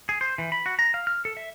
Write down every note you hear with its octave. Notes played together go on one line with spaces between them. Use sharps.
G#4
C5
E3
B5
F#4
A#5
F5
F6
A4
E5